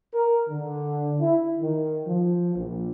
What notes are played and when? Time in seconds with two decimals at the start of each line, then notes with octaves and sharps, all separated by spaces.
0.13 A#4
0.49 D3
1.20 E4
1.59 D#3
2.06 F3
2.55 A#1